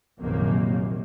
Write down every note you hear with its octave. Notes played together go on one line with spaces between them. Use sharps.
A#1 F#2 C3 D#3 A#3